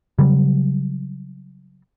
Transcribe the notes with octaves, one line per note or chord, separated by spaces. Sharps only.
C#3 F#3 G3